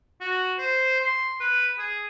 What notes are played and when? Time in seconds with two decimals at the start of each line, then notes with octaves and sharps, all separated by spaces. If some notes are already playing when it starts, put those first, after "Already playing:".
0.21 F#4
0.58 C5
1.00 C6
1.40 B4
1.79 G#4